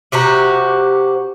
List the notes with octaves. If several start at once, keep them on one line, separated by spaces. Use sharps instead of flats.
C3 F#4 G4 A#5